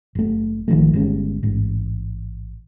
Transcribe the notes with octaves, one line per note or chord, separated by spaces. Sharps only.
F#1 A3
G#1 D#3 F3 A3
G1 G3 G#3 C#4
A1 G#2